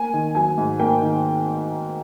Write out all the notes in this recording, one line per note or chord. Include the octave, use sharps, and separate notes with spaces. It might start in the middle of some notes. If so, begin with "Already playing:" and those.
Already playing: A#3 G#5
D#3
F#3 G#5
G#2
A#3 G5
D#3